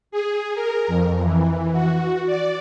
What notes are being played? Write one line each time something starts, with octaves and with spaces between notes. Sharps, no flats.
G#4
A#4
F2
E3
F#4
D5